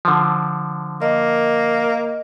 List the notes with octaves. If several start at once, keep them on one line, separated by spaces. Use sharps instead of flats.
D3 F3
A#3 D#5